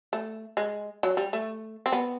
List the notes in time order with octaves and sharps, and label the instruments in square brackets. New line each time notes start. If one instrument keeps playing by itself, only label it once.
[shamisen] A3
G#3
F#3
G3
A3
C4
B3